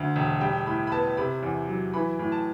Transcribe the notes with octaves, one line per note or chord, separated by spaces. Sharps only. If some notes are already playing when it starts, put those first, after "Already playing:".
Already playing: D2 D3
E1
G3 G5
A2 B5
B5
B3 A5
C3 B5
E2
F#3
E3 B5
A2
A5